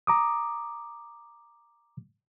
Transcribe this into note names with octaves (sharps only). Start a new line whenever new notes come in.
A#5 D6 D#6